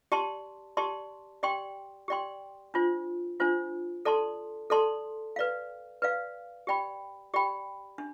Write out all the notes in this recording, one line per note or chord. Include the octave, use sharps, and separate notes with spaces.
G4 D5 A5 C6
G4 D5 A5 C6
G4 D5 G5 C6
G4 D5 G5 C6
D4 F4 C5
D4 F4 C5
A4 D5 A5 C6
A4 D5 A5 C6
B4 D5 F5
B4 D5 F5
G4 D5 G5 B5
G4 D5 G5 B5
D4